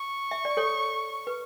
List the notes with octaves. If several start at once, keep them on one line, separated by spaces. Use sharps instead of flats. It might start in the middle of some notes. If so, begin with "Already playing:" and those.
Already playing: C#6
E5
D5
A4 C#5
B4